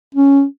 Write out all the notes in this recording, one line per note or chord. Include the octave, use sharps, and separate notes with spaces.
C#4